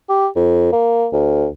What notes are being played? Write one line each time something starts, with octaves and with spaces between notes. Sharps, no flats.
G4
F2
A#3
D2